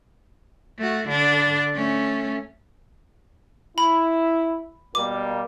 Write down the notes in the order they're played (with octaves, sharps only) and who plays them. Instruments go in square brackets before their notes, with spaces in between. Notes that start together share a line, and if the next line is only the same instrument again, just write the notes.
[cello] A3 F#4
D3 D4
A3 C#4
[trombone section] E4 [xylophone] B5
[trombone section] B2 G3 A#3 [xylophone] D6